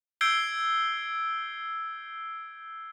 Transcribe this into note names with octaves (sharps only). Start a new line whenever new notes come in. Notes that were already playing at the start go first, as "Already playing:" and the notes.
E6 G6 G#6 C7 D7 G7